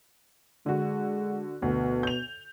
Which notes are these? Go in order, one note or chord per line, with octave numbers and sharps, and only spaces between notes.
D3 G#3 F#4
D2 B2
G6 F7